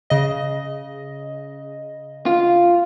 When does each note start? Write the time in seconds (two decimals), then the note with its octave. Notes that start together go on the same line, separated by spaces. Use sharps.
0.10 C#3 D#5
2.26 F4